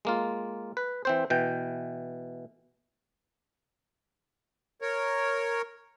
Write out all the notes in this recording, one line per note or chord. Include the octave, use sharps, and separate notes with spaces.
G#3 A#3 F4
B4
E3 C4 C5
B2 E3 G5
A#4 C#5